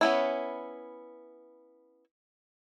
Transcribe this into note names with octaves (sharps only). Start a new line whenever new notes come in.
B3 C#4 E4